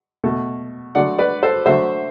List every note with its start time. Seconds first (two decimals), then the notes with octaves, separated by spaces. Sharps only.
0.24 B2 A3
0.95 D3 F#3 A3 D5 F#5
1.18 B4 D5
1.43 A4 C5
1.66 D3 F#3 A3 C5 E5